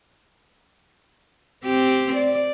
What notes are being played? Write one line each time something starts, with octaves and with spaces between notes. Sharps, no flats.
C4 G4
D5